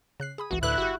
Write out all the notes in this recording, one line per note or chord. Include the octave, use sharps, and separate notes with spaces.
C#3 F#6 C7
G#4 B5 D#6
G#1 C#2 E3 F#4
D2 A2 E4 B4 D6 F#6
G1 F#4 G4